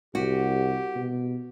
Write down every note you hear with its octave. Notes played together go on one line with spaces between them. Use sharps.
C2 F#4 G4
B2